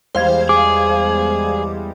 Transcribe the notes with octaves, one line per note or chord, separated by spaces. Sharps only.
E2 G3 G#3 C5 F5 G#6
G#4 D6